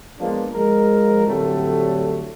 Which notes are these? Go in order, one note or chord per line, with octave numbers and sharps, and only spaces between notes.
F3 G#3 A#3 B3 D4 F4
F3 G#3 A#4
A2 D3 F#3 G3 A3 C4